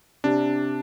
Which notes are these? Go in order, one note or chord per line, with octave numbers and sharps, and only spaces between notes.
C3 D4